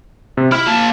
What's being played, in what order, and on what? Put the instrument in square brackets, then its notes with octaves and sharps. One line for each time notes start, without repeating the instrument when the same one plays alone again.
[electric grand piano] C3
[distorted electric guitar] E4 [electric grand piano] F6
[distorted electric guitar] A#3 A5